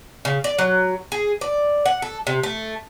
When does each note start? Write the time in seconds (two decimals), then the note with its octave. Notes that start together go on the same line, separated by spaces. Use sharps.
0.25 C#3
0.44 D5
0.59 F#3
1.12 G#4
1.41 D5
1.86 F#5
2.02 A4
2.27 C3
2.43 A3